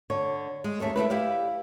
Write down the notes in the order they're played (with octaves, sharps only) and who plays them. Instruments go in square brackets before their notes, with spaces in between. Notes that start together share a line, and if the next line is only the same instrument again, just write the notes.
[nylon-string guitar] D3 C#5
G#3
D#2 A3 C#4 A4
A3 C4 E4 B4
E4 G4 D5 F5